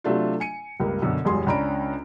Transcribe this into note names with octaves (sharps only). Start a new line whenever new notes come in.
C3 F#3 A3 D4 F4
G#5 C#7 D#7
C#2 G2 A#3
F#2 B2 D3
E1 F#2 G3 G#3 G#4 C6
C#2 C#4 D4 A#5 B5 D7